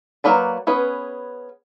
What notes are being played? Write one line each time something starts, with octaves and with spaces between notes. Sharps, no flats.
F#3 A#3 B4 D5
B3 C#4 G#4 B4